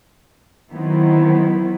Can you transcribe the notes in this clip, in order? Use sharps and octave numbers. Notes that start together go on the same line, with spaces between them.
D#3 F#3 B3 C4 E4